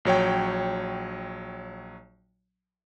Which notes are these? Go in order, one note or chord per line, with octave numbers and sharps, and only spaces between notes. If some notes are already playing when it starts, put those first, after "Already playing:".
A#1 F#3 C#5 G5